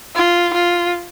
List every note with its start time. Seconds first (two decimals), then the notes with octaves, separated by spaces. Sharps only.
0.15 F4
0.54 F4